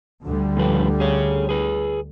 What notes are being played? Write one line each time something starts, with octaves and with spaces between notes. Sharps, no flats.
D2 D3 G3
A2 F3 B4
G#4 C#5
G#4 B4